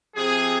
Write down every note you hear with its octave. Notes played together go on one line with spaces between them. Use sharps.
C3 F3 C4 G#4